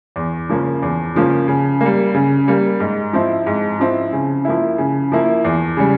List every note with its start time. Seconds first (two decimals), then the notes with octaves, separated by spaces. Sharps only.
0.16 E2
0.49 C#3 F3 A#3 C#4
0.82 E2
1.15 C#3 F3 A#3 C#4
1.48 C#3
1.81 G3 A#3
2.14 C#3
2.48 G3 A#3
2.80 G#2
3.13 F3 C4 E4
3.46 G#2
3.80 F3 C4 E4
4.13 C#3
4.45 F3 A#3 E4
4.78 C#3
5.12 F3 A#3 E4
5.45 E2
5.77 C#3 G3